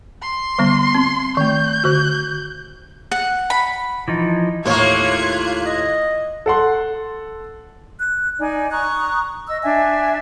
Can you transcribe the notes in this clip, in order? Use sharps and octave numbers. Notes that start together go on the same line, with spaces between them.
C6
D3 G3 B3
C4
D#3 A3 G6
D3 F#4
F#5
B5
E3 F3 D#4
D#2 A2 A3 A#3 F4 C#5 F#6 G#6
D#5
A4 F#5 C6
F#6
D#4 D5 G#5
A#5 C#6 D#6 F#6
D#5 E6
D4 E5 G#5